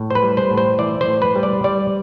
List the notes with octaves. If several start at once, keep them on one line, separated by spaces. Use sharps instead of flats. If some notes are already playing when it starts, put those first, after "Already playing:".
Already playing: A2
C5
B4
G3
C5
A2
C5
E3 D5
C5
A2
B4
G3
D5
G3 D5